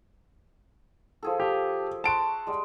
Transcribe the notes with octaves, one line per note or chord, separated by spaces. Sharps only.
F3 G#4 A4
G4
F#5 A5 C6 C#6 D7
G3 G#3